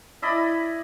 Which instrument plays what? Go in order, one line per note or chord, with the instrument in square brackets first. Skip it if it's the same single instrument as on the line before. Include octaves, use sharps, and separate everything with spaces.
[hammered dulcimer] E4 D5 D#5 B5